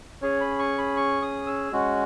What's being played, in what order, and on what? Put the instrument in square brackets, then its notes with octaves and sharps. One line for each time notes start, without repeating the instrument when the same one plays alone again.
[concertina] C#4 G#4 C#5
B5
C#6
B5
C#6
D#6
E6
G#3 C#4 F#4